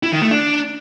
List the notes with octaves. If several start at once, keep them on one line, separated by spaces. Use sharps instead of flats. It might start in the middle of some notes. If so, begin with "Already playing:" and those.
E4
D#3
A3
D4